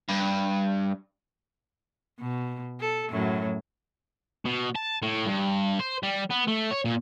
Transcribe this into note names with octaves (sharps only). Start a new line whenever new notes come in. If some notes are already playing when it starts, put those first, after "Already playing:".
G2
B2
A4
F#2 A2 F#3
B2
A5
A2
G2
C5
G3
B3
A3
C#5
A#2